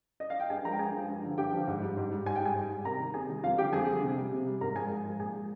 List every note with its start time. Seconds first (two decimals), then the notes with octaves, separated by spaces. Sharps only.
0.20 D#5
0.30 F5
0.40 G5
0.50 G2 G#4 G#5
0.65 F3 G#3 A#4 A#5
0.72 G5
0.79 G2 G#4 G#5
0.94 F3 G#3
1.09 G2
1.24 D3 F3
1.38 G2 G4 G5
1.52 D3 F3
1.67 G#2
1.82 G3
1.97 G#2
2.12 G3
2.26 G#2 G#5
2.36 G5
2.41 G3 G#4 G#5
2.56 G#2
2.70 G3
2.85 C3 A#4 A#5
3.00 D#3 G3
3.14 C3 G#4 G#5
3.29 D#3 G3
3.43 F2 F4 F5
3.58 G3 G4 G5
3.62 D3
3.73 F2 G#4 G#5
3.88 D3 G3
4.02 C3
4.17 G3
4.32 C3
4.46 G3
4.61 G#2 A#4 A#5
4.76 F3 G#3 G#4 G#5
4.91 G#2
5.05 F3 G#3
5.20 A#2 G#4 G#5
5.35 G#3